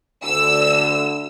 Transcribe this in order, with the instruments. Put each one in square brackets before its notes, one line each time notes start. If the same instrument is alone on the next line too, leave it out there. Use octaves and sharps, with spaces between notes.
[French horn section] D2 D3 [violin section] E6